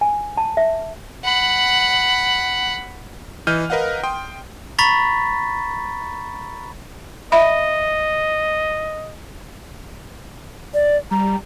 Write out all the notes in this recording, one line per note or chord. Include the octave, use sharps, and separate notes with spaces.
G#5
A5
E5
F#5 B5
E3 D#5 F6 G6 D#7
A#4 B4 D#5 F5 F#5
G5 C6 D#6
A#5 B5 C#6 A6 B6
D#5 E5 B5
D5
G3 A#5